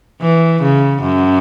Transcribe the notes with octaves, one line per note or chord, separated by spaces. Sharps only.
E3
C#3
F#2